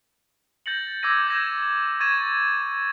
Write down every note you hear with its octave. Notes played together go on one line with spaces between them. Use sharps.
G6 A6 A#6 C#7 F#7
D6 E6 G#6 A#6 D#7
G6 G#6 A#6 E7
C#6 G#6 A6 D#7 E7